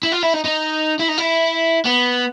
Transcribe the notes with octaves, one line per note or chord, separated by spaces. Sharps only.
E4
F4
E4
D#4
D#4
E4
D#4
E4
B3